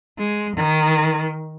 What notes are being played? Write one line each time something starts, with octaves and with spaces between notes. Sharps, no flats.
G#3
D#3